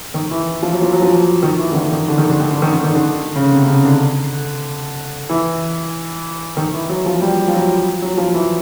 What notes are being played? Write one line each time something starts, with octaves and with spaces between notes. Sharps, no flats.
D#3
E3
F3
F#3
F3
F#3
F3
D#3
E3
D3
D#3
D#3
D3
D#3
D3
D#3
D3
D#3
D3
D#3
D3
C#3
C3
C#3
D3
E3
D#3
E3
F#3
F3
G3
F3
F#3
F#3
F3
E3